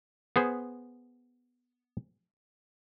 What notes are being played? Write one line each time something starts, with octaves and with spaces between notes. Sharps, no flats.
B3 G#4 C5